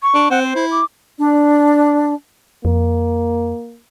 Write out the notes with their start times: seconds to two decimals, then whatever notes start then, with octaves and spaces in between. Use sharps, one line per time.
0.02 C#6
0.14 D4
0.30 C4 F#5
0.43 C5
0.55 E4
0.71 D6
1.18 D4
2.65 F2 A#3